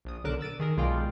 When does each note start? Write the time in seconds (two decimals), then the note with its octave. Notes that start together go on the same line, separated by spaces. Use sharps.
0.05 A#1 D#6
0.24 B1 D3 A#4 D6 F#6 E7
0.41 E6 A6 D7 D#7
0.60 D#3 G#4 A#4
0.77 B1 G#3 F4 D5 F5 G5